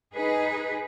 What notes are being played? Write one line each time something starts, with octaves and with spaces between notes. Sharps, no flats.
D#4 G#4 B4